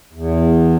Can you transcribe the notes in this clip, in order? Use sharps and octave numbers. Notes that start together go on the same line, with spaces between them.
E2